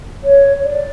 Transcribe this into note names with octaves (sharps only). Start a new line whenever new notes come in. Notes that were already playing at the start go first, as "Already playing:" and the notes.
C#5
D5